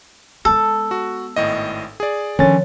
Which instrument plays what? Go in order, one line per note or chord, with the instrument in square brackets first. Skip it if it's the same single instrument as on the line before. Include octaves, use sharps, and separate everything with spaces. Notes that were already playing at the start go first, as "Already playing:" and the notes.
[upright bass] G#3 B3 [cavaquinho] A4
[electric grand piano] F#4
G#1 A2 D#5
G#4 D5
[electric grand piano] D3 A6 [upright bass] D#3 F3 [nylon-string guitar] C#4